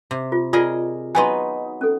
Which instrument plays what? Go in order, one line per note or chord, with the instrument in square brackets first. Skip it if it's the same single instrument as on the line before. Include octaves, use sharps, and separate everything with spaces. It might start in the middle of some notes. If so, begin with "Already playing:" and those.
[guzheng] C3
[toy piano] F4
[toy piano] F4 D5 F#5 [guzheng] G#4 A#4 D#5
[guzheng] F#3 B3 D#4 [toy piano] G#5 C6
[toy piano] C#4 A4